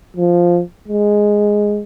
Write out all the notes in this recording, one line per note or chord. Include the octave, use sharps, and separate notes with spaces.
F3
G#3